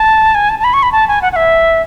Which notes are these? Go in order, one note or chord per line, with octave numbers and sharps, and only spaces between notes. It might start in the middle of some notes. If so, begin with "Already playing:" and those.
Already playing: A5
G#5
A5
A5
B5
C#6
B5
A5
G#5
F#5
F#5
E5